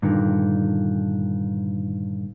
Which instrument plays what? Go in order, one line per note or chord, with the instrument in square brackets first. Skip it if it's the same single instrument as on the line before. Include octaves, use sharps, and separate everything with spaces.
[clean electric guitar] G2 A#2 D3 D#3